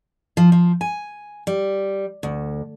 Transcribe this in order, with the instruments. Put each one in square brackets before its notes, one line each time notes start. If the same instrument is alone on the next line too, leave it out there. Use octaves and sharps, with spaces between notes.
[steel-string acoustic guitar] F3
F3
G#5
G3
D2